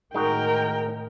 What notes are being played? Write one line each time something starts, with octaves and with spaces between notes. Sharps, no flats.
A2 D#3 G#3 D#4 F#4 A#4 G5